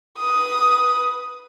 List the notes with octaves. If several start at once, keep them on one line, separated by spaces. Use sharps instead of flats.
B4 D#6